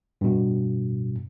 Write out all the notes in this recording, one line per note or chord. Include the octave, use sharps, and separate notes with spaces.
G2 B2